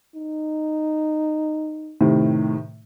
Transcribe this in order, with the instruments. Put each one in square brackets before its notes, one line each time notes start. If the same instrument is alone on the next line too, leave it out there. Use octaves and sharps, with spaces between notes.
[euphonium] D#4
[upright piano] A2 C3 D#3